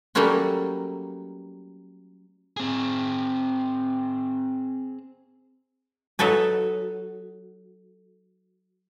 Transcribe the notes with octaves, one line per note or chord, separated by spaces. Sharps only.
F#3 G3 A3 A#3 C#4 F#4
C4 G#4
F#3 D#4 A4 B4 G#5